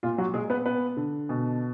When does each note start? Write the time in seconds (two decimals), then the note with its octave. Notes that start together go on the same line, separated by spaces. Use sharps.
0.03 A#2 F4
0.18 F#3 F#4
0.34 A#2 G#3 G#4
0.50 B3 B4
0.66 B3 B4
0.97 D3
1.29 B2